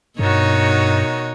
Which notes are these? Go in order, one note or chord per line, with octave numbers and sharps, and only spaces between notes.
G2 B2 D#3 D#4 F#4 C#5